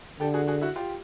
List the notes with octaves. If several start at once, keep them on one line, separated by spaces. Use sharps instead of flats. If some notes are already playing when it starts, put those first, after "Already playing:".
D3 G4 A4
F#4 G#4
F#4 G#4
E4 F#4
F4 G4